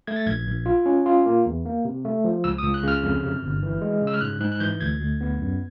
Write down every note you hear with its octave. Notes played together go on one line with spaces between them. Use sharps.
A3 G#6
A6
A#1 G#6
A#1
F4
C#4
F4
A#3
E2
A#3
C3
A3
F3
C#2 E6
C#2 D#6
F#6
C#3 F6
F2
C3
G1
E3
G#3
C#3
E6
F6
G#2 F#6
G#2 F#6
F#6
E3 G6
D2 G#6
D2
B3
F#2